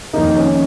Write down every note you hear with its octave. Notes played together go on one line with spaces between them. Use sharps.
F2 D#3 A#3 D#4
C#4